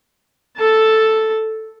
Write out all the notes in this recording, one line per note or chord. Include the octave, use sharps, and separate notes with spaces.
A4 A5